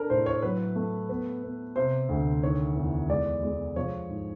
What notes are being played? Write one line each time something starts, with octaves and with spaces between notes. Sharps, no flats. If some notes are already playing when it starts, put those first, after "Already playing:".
Already playing: D4 A4 A#4
A2 C5
C#5
F#3 B4
A3
B3
B3
C3 C5
D2
D#3 C#5
E2
G#3 D5
G#3
F3 C#5
G#2